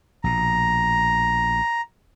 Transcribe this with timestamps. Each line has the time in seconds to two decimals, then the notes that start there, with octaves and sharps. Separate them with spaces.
0.24 A#1 B2 A#5